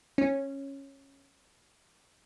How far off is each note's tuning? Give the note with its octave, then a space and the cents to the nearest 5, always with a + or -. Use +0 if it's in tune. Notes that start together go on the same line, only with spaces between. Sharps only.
C#4 -10